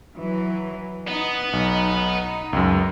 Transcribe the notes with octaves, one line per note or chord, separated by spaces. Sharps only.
E3 F#3
B3 D#4
B1 D#4
C#2 F#2